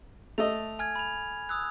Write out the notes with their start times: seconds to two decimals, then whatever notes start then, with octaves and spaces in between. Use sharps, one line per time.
0.38 A3 A4 D#5 F7
0.79 G#5 F6 G#6
0.96 B5 F7
1.49 D#6 E6 F#6